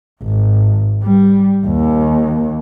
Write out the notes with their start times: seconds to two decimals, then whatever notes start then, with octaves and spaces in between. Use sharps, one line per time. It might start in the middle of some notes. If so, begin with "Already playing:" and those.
0.23 G#1
1.04 G3
1.67 D#2